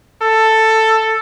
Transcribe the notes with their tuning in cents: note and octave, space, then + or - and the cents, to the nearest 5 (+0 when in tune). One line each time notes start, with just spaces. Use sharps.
A4 +10